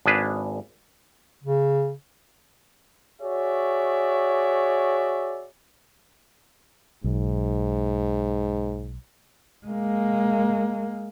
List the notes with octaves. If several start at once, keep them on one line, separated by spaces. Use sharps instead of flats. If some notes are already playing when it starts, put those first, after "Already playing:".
G#1 D4 G#4 B4
C#3
F#4 G#4 C#5 D5 E5
B1 G#2
G#3 A#3